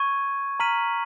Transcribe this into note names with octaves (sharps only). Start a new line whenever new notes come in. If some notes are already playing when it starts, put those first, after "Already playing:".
Already playing: C#6 G#6 D#7
A#5 F6 B6 D#7 F#7